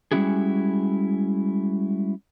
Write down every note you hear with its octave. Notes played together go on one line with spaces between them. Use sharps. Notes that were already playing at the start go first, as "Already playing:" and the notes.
G3 G#3 C#4 E4 F#4 G#4